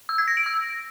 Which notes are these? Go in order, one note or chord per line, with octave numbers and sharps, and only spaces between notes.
E6
G#6
A#6
D7
E6